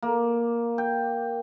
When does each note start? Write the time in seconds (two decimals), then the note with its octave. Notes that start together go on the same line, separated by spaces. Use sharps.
0.02 A#3
0.78 G5